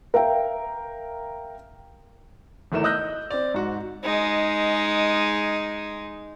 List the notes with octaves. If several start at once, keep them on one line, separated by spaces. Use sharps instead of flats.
A#4 E5 F5 G5
G#1 E2 A3 A#4 E7
D#5 D#6 E6 F#6 G6 A#6
C4 D5
G#2 F#4
G#3 D#4